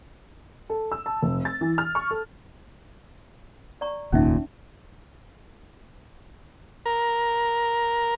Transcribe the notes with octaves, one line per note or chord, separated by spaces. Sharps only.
A4
E6
A5
F1
A6
E3
F6
C#6
A4
D5 A#5 C#6
F1 D#2 A#2 C#4 D#4 E5
A#4